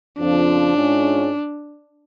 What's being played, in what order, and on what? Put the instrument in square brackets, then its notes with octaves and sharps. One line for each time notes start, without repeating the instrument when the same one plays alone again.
[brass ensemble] F2 C#3 F3 [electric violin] D4
[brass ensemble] G#2 G#3 C#4 F4